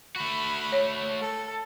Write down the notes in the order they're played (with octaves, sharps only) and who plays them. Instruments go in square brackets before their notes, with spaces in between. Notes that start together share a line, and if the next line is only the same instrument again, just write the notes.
[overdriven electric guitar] A3 F#4 [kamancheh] B5
[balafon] C#5
[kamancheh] A4